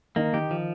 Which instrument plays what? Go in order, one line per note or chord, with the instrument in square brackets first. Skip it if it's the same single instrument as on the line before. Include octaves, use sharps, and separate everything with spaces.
[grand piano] D#3 D#4 [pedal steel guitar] A#3
[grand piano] D#3 D#4 [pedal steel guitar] G4
[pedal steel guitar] F3